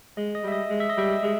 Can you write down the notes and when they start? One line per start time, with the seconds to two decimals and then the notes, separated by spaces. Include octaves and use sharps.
0.17 G#3 D#5
0.35 D#5
0.44 G3 E5
0.52 D#5
0.70 G#3
0.80 E5
0.89 D#5
0.97 G3 E5
1.23 G#3